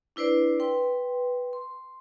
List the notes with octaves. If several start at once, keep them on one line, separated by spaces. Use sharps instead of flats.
D4 E4 B4 C5 D5
B4 G5 C6
C6